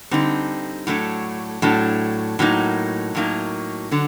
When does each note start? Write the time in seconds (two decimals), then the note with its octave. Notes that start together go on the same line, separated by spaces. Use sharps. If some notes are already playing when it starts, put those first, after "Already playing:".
0.11 D3 G3 C4 D#4
0.87 A2 F#3 A3 D4
1.62 A2 F#3 A3 D4
2.39 A2 F#3 A#3 D#4
3.15 A2 F#3 A#3 D#4
3.91 D3 F#3